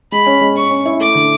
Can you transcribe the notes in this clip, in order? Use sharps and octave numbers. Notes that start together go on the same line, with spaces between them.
G#3 B5
C#4
G#3
C#4 C#6
C#4
E4
A3 D6
D3